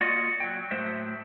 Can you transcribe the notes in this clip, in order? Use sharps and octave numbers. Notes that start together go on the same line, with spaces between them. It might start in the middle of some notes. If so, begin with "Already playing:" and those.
A#3 F4 F#4 D5 D#5
F#3 G5
A2 F#3 A3 C5 E5